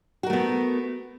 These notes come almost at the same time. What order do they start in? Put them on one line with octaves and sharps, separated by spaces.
F#4 A#4 A3 B3